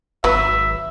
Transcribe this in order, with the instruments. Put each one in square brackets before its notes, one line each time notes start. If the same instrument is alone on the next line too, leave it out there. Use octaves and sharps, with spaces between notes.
[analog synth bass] G#1 [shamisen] F#3 B4 [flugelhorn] E5